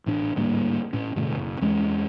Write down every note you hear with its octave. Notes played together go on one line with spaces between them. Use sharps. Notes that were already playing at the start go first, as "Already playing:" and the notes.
A1 A2 D4
D2 G#2 G3 A#3
A2 C#4
G2 B2 D3 A3
F#1
E2 G#3 C#4